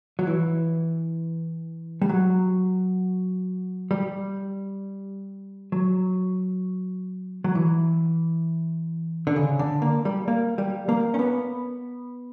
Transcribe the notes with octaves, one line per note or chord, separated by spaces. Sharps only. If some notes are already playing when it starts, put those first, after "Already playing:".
F#3
E3
G3
F#3
G3
F#3
F#3
E3
D3
C#3
D3
A#3
G3
A#3
G3
A#3
C#4
B3